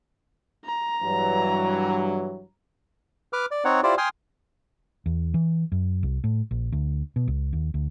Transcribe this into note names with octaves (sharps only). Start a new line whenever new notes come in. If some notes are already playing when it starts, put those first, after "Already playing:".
A#5
G2 E3 F#3
B4 D6 F6
D5
C4 D#4 C#5 F#5
E4 F4 G4 C5 D5
G5 G#5 C6 D#6 F6
E2
E3
F#2
C2
A2
A#1
D2
B2
C#2
D#2
D2